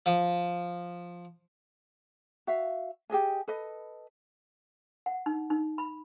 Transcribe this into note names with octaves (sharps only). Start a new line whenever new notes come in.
F3
F#4 E5 F5
G4 G#4 D#5 G#5
A4 B4 D#5
F#5
D#4
D#4
B5